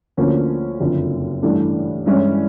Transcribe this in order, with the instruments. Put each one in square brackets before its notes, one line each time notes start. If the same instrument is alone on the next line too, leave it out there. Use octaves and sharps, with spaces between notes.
[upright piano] D2 D3 F3 A#3 C#4
F#1 F2 D3
A1 G2 E3 A3 D4
G2 E3 G#3 C#4 E4